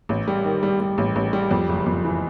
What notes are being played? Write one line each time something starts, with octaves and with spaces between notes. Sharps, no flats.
A1
G3
D#3
G3
G3
A1
A1
G3
F2
F#1
F2
E3